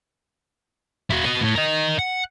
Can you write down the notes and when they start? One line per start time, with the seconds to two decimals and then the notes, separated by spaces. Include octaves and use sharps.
1.10 E4 F#4
1.25 F#4 D#5
1.41 A2
1.55 A#4 D#5
1.99 F#5